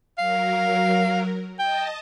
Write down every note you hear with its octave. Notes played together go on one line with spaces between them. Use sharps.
F#3 A#4 F5
D#5 G5 A5